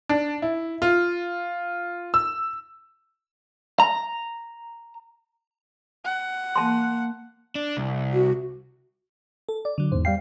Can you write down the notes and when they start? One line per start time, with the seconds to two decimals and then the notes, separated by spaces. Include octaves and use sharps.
0.09 D4
0.42 E4
0.82 F4
2.14 E6
3.80 A#5
6.05 F#5
6.56 A#3 A5 C6
7.55 D4
7.77 C2
8.13 F#4
9.49 A4
9.65 D5
9.78 D3 F#3
9.92 E2 G#2 C5
10.05 G3 F5 G5 C7